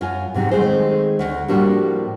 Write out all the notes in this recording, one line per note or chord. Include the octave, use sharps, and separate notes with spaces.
F#2 F4 G#5
G#2 C3 F#3 D#4
D#3 G#3 A3 C4 G#4 C5
D2
A2 F3 G3 A#3 D4 F#4